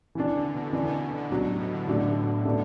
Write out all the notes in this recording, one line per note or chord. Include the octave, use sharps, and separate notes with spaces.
B2 E3 D4
D3
B2
B2 E3 D4
B2
B2
D3
B2 D3 F#3 D4
A2
B2
D3
A2 F#3 A3 D4
B2 F#3 A3 D4